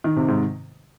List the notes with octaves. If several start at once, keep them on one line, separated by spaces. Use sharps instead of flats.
D#3
C3
G#2